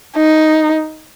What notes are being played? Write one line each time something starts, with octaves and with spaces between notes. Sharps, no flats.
D#4